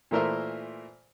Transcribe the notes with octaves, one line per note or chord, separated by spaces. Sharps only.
A#2 E3 A3 A#4 C5 E5